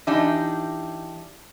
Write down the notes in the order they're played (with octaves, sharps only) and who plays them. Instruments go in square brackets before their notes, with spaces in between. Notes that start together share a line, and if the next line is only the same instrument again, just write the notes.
[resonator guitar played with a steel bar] E3 D4 D#4 G4